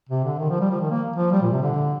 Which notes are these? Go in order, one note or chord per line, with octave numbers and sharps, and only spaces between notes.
C3
D3
D#3
F3
G3
F3
D#3
A#3
F3
G3
A#2
C3
D3